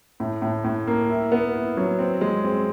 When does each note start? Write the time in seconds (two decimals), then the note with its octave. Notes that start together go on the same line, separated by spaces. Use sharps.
0.20 A2
0.42 A2
0.64 A2
0.87 A#3
1.09 E4
1.32 B3
1.55 E4
1.77 F#3
1.99 C4
2.21 G#3
2.44 C4